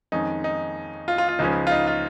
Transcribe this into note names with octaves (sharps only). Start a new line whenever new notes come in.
F2 D#3 G#3 C#4 D#4
D#4
F4
F4
F4
C#2 C#3 F3 G#3 C#4 D#4
F4
D#4
F4